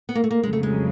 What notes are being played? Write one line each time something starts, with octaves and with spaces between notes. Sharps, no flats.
B3
A#3
A3
A#3
F2 C#3 F#3 G#3
A3
G#3